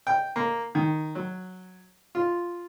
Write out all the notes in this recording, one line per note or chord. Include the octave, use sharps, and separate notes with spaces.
G5
A#3
D#3
F#3
F4